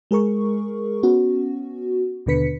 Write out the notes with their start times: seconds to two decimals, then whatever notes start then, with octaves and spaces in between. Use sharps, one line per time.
0.11 G#3 G#4 A#4 C#6
1.03 B3 C#4 F#4
2.26 D#2 B2 D3 B4 B6 C#7